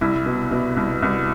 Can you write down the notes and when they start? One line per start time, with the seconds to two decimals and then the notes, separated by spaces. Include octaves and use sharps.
0.01 C2 E4
0.26 B2
0.51 B2
0.77 C2
1.02 C2